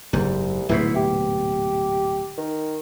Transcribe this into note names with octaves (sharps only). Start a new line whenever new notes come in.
F#1 C2 G#2
D1 G#2 B2 E4
G4
D#3